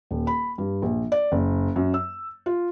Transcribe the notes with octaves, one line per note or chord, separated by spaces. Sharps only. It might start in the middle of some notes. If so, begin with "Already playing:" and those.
D#1
B5
G2
A#1
D5
F#1
F#2
E6
F4